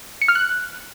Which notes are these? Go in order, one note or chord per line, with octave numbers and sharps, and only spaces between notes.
C#7
F6
F#6